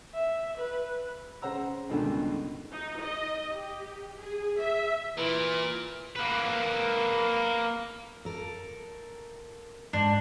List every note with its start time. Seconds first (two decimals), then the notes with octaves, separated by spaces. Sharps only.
0.14 E5
0.58 B4
1.42 C#3 C5 F#5 A#5 E6
1.89 C#2 G2 B2 D3 D#3
2.72 D#4
3.02 D#5
3.52 G4
4.17 G#4
4.60 E5
5.18 A#2 E3
6.16 A#3 B4
8.25 A4 A#4
9.93 G#2 D4